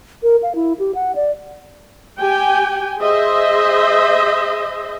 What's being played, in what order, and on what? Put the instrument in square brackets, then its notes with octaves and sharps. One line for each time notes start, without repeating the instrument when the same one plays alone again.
[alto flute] A#4
F5
E4
G4
F#5
D5
[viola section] G4 G5 G#5
G#4 C5 D#5 E5